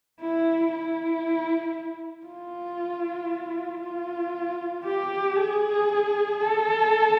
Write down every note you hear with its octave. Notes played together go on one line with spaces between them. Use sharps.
E4
E4
F4
F4
G4
G#4
A4